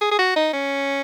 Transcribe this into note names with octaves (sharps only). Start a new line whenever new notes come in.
G#4
G#4
F#4
D#4
C#4